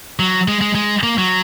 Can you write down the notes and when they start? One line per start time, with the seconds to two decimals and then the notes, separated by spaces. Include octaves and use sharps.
0.19 F#3
0.48 G#3
0.61 G#3
0.75 G#3
1.03 A#3
1.18 F#3